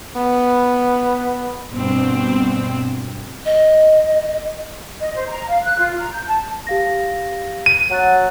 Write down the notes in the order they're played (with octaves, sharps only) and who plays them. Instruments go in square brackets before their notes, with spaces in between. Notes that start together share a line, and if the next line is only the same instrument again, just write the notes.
[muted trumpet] B3
[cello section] G2 B2 C4
[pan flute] D#5
[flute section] D#5
C5
A#5
F5
F#6
F4
A#5
G6
A5
[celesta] G4 F5 A#6
[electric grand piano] D#7
[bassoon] F#3 [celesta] F#5 F#6 A6